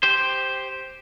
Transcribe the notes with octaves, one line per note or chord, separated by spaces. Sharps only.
G4 C5